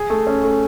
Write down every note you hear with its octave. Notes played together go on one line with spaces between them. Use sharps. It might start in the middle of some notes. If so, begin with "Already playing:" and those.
Already playing: G#4
A3
C#4
A3